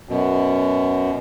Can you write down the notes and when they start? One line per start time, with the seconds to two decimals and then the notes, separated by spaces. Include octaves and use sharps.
0.09 F#2 B2